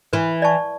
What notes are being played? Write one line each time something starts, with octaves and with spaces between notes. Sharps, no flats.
E3 B4
D5 A5 C#6